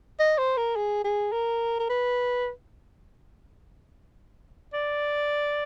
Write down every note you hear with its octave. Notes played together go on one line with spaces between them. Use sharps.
D#5
C5
A#4
G#4
G#4
A#4
A#4
B4
D5